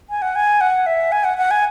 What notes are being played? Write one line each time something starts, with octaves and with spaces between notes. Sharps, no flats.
G#5
F#5
G#5
F#5
E5
G#5
F#5
F#5
G#5